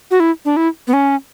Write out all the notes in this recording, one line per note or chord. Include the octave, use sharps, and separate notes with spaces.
F#4
E4
D4
E4
B3
C#4